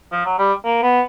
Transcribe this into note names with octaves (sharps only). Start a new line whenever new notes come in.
F3
F#3
G3
A#3
B3